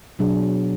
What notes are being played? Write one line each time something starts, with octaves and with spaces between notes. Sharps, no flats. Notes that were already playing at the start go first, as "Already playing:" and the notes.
B2 F#3 D4 G#4